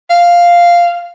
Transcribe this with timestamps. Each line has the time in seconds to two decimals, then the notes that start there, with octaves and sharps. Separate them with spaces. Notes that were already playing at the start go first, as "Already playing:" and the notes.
0.10 F5